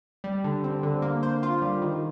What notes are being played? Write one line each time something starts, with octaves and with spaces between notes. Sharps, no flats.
G3
D3
C4
D3
A#3
C5
F4
G3
D#3